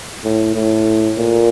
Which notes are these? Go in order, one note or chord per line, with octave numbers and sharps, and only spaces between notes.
A2
A2
A#2